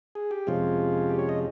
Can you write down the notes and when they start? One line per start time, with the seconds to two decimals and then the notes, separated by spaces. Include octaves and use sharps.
0.15 G#4
0.31 G4
0.47 F2 C3 F3 G#3 C#4 F4
1.09 G4
1.19 C#5
1.29 D#5